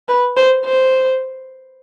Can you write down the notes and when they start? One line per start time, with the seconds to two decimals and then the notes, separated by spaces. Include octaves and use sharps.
0.08 B4
0.37 C5
0.65 C5